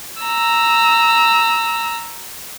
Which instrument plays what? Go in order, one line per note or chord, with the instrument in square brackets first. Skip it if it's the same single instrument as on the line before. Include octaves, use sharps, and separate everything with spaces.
[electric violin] A#5 E6